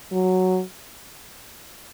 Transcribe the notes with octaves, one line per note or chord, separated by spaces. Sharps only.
F#3